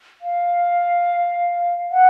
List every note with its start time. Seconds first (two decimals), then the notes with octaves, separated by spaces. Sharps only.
0.21 F5
1.91 F#5